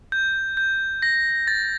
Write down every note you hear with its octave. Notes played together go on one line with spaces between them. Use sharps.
G6
G6
A#6
A6